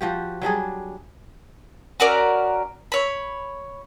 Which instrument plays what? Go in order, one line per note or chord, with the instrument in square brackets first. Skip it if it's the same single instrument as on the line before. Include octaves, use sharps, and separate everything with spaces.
[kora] F3 F#4 G4
F#3 G3 D4 G#4
[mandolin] C#4 F#4 A#4 D5
C#5 B5